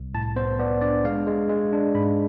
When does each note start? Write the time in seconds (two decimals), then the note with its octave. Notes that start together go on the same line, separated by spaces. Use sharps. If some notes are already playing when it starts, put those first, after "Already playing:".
Already playing: C2
0.14 A2 A5
0.36 B3 C5
0.59 B3 D5
0.81 D4 D5
1.04 G#3 F5
1.27 G#3
1.50 G#3
1.73 D4
1.95 G#2 B5